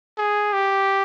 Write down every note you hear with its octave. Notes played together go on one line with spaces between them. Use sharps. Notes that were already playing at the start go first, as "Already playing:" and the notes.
G#4
G4